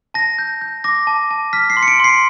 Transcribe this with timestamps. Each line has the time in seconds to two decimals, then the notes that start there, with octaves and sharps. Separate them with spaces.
0.14 A5 A#6
0.38 G6
0.61 G6
0.84 D6 A#6
1.07 A5
1.31 A5
1.53 F6 B6
1.70 C7
1.77 C6
1.83 C#7
1.88 D7
2.00 C6 C7